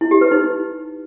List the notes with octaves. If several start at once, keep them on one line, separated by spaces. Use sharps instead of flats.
E4
G4
B4
D#4